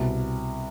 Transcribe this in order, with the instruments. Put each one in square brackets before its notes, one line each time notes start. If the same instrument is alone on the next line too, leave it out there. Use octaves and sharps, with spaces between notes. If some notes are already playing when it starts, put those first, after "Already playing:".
Already playing: [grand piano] C2 B2